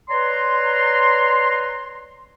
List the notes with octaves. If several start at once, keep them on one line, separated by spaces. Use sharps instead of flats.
B4 C#5 D5 A#5 C6